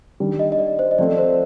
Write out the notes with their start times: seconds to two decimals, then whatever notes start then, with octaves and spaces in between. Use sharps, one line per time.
0.20 D#3 G3 D4
0.39 D#5
0.52 D#5
0.59 D5
0.79 C5
0.91 D#5
0.98 F3 A3 C4 D5
1.18 C5